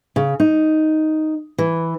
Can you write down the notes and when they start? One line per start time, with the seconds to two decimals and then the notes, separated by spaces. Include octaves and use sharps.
0.16 C#3
0.40 D#4
1.58 E3